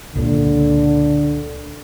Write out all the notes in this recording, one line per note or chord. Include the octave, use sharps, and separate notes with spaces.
C#2 A#2 D3